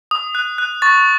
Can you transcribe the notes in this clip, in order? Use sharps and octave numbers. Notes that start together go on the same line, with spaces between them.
D#6
F#6
F#6
C#6 A6